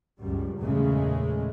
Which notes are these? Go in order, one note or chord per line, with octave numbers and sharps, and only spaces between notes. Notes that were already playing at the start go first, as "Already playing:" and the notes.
C#2 F#2 G3
E2 A#2 C#3 G#3 A3